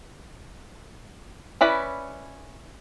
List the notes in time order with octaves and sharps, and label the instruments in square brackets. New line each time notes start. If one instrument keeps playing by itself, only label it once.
[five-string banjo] C#4 E4 B4 D5 G#5